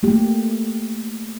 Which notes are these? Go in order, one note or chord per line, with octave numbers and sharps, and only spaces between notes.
A3 A#3 G4